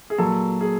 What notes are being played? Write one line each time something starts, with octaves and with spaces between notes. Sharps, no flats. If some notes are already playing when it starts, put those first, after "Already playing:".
G#4
A#2 F#3 A4
G#4